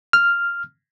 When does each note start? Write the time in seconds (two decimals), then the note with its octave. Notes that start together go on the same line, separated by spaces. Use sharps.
0.13 F6